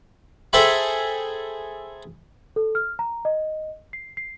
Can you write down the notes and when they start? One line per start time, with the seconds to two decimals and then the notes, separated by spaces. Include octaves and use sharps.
0.53 G#4 A4 C5 E5 G5 B5
2.56 A4
2.75 F6
2.99 A#5
3.25 D#5
3.93 C7
4.17 C7